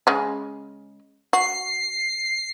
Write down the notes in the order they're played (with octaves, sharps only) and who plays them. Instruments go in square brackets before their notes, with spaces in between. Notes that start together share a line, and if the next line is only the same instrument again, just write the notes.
[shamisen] C#3 G#3
[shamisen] F#4 [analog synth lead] C7